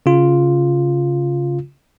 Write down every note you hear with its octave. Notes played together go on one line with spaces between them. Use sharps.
C#3 F4